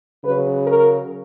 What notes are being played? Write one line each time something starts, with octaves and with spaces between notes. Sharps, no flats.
C#3 F#3 B4
A#4